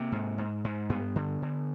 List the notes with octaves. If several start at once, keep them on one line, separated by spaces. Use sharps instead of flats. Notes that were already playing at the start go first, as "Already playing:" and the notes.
Already playing: C3 A#3
G#2
G#2
G#2
G2 B3
D3
D3